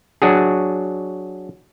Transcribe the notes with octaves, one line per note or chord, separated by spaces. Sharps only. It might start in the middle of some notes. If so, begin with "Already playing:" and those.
F#3 D4 F#4 G#4